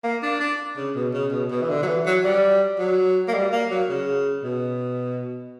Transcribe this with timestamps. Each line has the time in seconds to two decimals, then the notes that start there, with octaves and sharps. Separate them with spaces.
0.04 A#3
0.23 D4
0.40 D4
0.77 C#3
0.96 B2
1.13 C#3
1.32 B2
1.51 B2
1.62 E3
1.69 D3
1.83 F#3
1.87 E3
2.06 F#3
2.24 G3
2.79 F#3
3.28 A#3
3.34 G3
3.52 A#3
3.70 F#3
3.89 C#3
4.43 B2